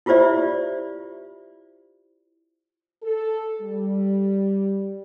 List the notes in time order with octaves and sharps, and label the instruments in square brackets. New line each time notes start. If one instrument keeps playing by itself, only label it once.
[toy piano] E4 F4 G4 C5 D5 E5
[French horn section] A4
G3